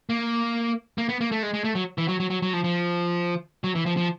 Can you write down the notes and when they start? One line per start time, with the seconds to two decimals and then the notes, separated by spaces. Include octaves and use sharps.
0.10 A#3
0.98 A#3
1.09 B3
1.21 A#3
1.32 A3
1.43 G#3
1.54 G#3
1.64 A3
1.75 F#3
1.98 E3
2.08 F#3
2.20 F#3
2.30 F#3
2.42 F#3
2.53 F3
2.64 F3
3.64 F#3
3.75 E3
3.86 F3
3.97 F3